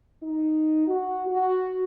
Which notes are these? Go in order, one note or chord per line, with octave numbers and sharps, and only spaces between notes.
D#4
F#4
F#4